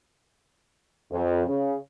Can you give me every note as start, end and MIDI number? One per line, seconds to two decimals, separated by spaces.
1.12 1.46 41
1.47 1.75 49